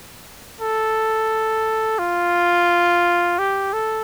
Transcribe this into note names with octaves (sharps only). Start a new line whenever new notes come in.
A4
F4
G4
A4